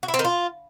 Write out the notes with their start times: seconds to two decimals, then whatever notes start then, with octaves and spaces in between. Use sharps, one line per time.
0.03 F#4
0.08 E4
0.14 C4
0.19 D#3
0.25 F4